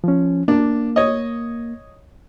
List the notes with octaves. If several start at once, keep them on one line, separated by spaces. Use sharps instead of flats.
F3 C#4
A#3 D4
C#5 D#5